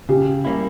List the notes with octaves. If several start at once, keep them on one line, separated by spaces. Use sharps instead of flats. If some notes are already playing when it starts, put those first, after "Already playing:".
C#3 G4
G3 A#3 C#4 E4